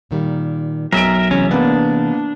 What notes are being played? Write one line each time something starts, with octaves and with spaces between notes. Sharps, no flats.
A#2 D#3 G3
B1 A#4 E5 D7
C3 E3 G#3 C#4
A#3 B3 D4